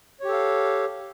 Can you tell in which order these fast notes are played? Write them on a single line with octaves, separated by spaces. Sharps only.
C#5 G4 A4 F5